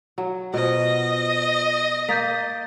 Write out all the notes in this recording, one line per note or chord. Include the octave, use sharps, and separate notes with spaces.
F#3
B2 F4 C5 D#5
A#3 G6 A6 B6